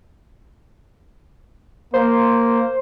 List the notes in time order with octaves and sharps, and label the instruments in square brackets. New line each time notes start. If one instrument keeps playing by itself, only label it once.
[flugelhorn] A#3 [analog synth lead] C5